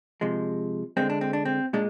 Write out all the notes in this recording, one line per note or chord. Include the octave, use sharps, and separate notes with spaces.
C3 F3 G#3
D3 G#3 C4
D4
C4
D4
C4
A#2 G#3 D4